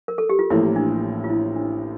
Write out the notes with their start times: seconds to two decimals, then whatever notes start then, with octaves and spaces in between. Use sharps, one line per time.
0.08 A#4
0.18 A4
0.30 G4
0.39 F4
0.50 A1 A2 F3 A#3 E4
0.76 D4
1.24 F4
1.30 E4
1.56 D4